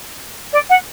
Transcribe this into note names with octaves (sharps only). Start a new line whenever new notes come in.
D5
F#5